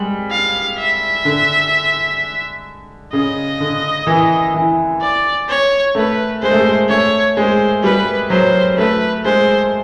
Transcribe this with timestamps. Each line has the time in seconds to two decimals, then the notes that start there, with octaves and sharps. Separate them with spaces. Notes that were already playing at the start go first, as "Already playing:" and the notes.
Already playing: G3 G#3
0.31 F5
0.78 E5
1.25 D3
3.13 C#3 D#5
3.60 D3
4.07 E3
4.54 E3
5.01 D5
5.49 C#5
5.95 A3 B4
6.42 G#3 C5
6.51 A3
6.59 G#3
6.89 A3 C#5
7.37 G#3 C5
7.83 G3 B4
8.30 F#3 C5
8.77 A3 B4
9.25 G#3 C5